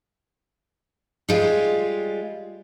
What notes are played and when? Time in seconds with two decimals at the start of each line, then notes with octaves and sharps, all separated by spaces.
1.29 G3 G#3 F4